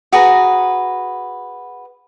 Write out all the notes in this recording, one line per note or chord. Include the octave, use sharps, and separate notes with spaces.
F#4 G#4 B4 A#5